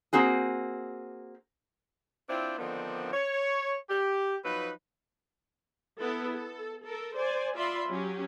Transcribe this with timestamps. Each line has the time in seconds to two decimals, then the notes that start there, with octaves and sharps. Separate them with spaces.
0.13 A#3 C4 F#4 G#4
2.29 C4 D4 E4 F4 C5 G5
2.58 D3 D#3 F3 B3 C4 D4
3.13 C#5
3.89 G4
4.44 F3 F#3 D#4 B4
5.99 B3 E4 A4
6.33 A4
6.85 A4 A#4
7.16 C5 D5 G#5
7.55 F4 D5 E5 B5 C6
7.89 F#3 C#4 G4